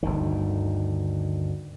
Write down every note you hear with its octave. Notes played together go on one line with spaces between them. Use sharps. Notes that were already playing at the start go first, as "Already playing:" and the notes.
G1 D2 D#3